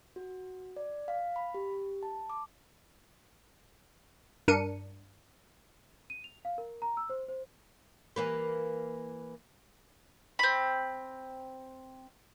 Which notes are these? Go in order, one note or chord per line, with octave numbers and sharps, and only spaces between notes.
F#4
D5
F5
B5
G4
A5
D6
G2 D4 A#4 C#7 D#7
D#7
F7
F5
A#4
A#5
E6
C5
C5
E3 A#3 B4
C4 B5